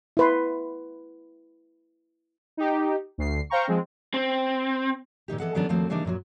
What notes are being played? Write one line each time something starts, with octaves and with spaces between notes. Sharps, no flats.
E4 B4 C6
D#4 G4
D2 C7
C5 F5 G5 A#5 C#6
F3 G#3 C4
C4
A#2 D#3 D#4 G4
E3 B3 A4 D#5 F#5
D#3 F#3 G3 B3 C#4 D4
D#2 F3 A3 A#3 C4 F#4
C#3 E3 G3 A#3 D4 D#4
F#2 A#2 E3 F#3